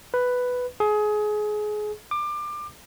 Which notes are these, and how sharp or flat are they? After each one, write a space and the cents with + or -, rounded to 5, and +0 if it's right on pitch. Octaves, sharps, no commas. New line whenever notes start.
B4 +5
G#4 +25
D6 +25